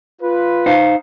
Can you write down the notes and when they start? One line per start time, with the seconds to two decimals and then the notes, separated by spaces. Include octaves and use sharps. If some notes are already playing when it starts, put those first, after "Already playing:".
0.22 F4 B4
0.66 D#4 C5 F5